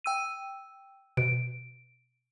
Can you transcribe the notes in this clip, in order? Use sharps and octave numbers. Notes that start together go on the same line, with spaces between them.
G5 E6 D#7
B2 D7